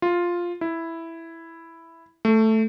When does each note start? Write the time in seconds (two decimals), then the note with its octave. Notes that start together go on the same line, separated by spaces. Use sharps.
0.02 F4
0.61 E4
2.25 A3